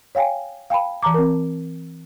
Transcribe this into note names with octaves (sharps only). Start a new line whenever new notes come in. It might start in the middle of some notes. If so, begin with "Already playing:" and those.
C#5 F5 G5 G#5
F5 G5 A5 B5
E3 A5 A#5 D6
C4 A#4